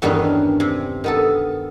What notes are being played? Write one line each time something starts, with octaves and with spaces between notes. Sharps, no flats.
E2 G2 D#3 C#4 D4 B4
C3
D#3 B3 A4